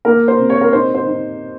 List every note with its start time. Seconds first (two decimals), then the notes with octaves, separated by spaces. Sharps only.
0.05 A#3 A#4
0.28 C5
0.39 C3
0.50 C#5
0.61 A#4
0.73 D#4 C5
0.95 C5
1.06 D#4